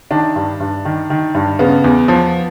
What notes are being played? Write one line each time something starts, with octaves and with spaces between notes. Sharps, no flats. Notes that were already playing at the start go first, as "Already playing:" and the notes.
D#3 D4
G2
G2
D#3
D#3
G2
C#3 B3
E2
F3